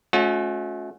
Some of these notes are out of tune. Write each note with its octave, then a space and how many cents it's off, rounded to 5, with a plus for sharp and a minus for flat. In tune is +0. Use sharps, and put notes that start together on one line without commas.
A3 -40 C#4 +0 F#4 -45